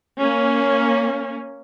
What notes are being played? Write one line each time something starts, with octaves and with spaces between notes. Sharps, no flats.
A#3 C#4